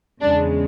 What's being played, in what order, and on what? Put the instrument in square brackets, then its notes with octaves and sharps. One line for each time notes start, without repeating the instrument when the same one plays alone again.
[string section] E2 C#3 G#3 D4